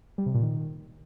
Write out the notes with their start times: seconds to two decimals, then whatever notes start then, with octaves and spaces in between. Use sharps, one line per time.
0.18 G3
0.26 C3
0.34 A#2
0.43 D#3